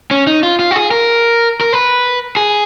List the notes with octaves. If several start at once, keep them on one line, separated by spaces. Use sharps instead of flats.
C#4
D#4
F4
F4
F#4
G#4
A#4
A#4
B4
G#4